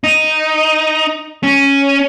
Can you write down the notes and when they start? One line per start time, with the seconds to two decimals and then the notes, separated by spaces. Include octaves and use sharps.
0.04 D#4
1.43 C#4